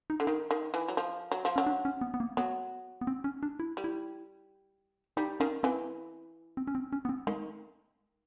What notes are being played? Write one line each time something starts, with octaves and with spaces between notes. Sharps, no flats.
D#4
D3
D#3 D#4
D#3
E3
F#3
F3
F#3
F3
F#3 C#4
D4
C#4
B3
B3
A#3
F#3 B3
B3
C4
C#4
D4
E4
G3
E4
G3 D#4
D#3 C#4
E3 C4
C4
C#4
C4
C#4
B3
C4
D#3 G#3